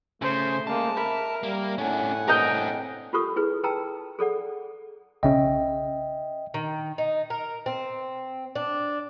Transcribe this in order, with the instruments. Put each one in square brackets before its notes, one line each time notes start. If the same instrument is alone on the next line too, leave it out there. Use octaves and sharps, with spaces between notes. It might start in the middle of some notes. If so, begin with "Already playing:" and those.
[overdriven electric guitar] C#3 [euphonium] A3 [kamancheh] C5
[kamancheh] G#3 A#3 [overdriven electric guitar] A5
[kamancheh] A#4 [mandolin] E5 B5
[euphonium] G3 [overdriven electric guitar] A#3
[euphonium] A2 [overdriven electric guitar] C#4 D4 [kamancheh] F#5 G#5
[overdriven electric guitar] C4 D4 [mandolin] A#4 D#5 G5
[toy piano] F4 G4 A4 A#4 C#6 D#6
E4 G#4 B4
B4 G5 A5 A#5 E6
G#4 A4 D5 F#5
[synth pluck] B1 C#3 C#4 [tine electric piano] D#5 E5 G5
[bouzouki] D#3
D#4
A#4
C4
D4